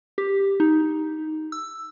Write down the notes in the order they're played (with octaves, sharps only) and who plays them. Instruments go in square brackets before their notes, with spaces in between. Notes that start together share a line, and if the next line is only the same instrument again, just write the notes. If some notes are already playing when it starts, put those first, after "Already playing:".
[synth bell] G4
D#4
E6